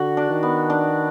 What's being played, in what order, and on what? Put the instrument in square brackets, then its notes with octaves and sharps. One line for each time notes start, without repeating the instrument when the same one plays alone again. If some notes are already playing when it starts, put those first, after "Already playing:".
Already playing: [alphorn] D3 [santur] F#4
[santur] D4
[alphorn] D#3
[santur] B3
D4